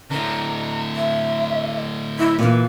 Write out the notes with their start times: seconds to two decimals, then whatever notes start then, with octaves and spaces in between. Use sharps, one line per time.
0.10 A2 D3 A#5
0.94 E5
2.18 E4
2.39 A#2 E3 F5